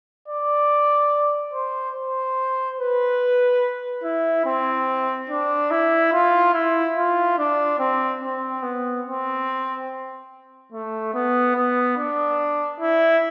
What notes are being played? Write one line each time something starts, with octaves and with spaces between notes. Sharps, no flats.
D5
C5
C5
B4
E4
C4
D4
E4
F4
E4
F4
D4
C4
C4
B3
C4
A3
B3
B3
D4
E4